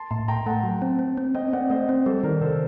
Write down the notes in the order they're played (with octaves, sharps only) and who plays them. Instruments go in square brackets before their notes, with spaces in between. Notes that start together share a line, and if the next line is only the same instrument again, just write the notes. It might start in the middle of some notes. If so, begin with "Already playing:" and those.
Already playing: [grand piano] A5 C6
[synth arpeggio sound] A2 [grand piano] A5 C6
[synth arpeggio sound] A2 [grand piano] G5 A#5
[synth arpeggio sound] A3 [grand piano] F#5 A5
[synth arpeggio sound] F#3
C4
C4
C4
[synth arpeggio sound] C4 [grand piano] D#5 G5
[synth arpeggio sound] C4 [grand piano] D5 F#5
[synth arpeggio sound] A3 [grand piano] C5 D#5
[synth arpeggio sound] C4
[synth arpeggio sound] G3 [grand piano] A4 C5
[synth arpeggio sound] D#3 [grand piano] A#4 D5
[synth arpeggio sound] C3 [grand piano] A4 C5